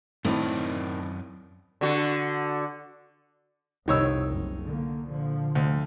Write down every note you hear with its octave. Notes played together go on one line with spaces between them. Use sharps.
F#2 A2 D#3 C4 E4 D5 D#5
D3 F#4
C2 F2 D#3 C#5 E6
F#1
D3 A#3
A#2 D3 F3
D2